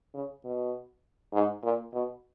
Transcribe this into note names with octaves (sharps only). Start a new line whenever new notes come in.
C#3
B2
G#2
A#2
B2